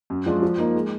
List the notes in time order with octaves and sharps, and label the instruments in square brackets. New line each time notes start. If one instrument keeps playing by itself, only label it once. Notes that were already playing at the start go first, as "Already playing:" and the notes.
[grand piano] F#2
F3 G#3 D4 F4
F3
A#3 D#4
G#3